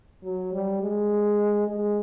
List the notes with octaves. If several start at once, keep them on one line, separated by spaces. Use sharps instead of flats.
F#3
G3
G#3
G#3